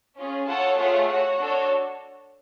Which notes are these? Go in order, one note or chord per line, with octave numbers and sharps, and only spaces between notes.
C#4 F4 G#4
F4 A4 C#5 F#5 A5
A3 F4 G#4 C#5 F#5
F#4 C#5 F#5
D4 F#4 A4 C#5